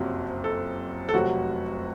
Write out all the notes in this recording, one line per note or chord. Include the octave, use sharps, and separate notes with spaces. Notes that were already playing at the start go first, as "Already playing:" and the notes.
Already playing: F#1 F2 C3 F#3
A4
A4
F1 F2 C3 F#3 F#4